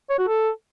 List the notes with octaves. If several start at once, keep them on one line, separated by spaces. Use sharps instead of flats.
C#5
F#4
A4